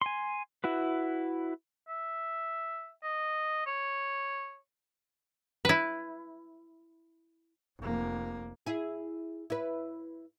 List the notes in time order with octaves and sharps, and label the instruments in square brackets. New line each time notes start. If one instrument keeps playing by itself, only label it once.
[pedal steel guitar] G#5 C6
E4 F#4 B4
[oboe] E5
D#5
C#5
[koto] E4 B4
[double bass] F1 A#3
[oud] E4 G#4
E4 B4